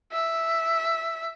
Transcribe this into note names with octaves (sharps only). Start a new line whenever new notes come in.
E5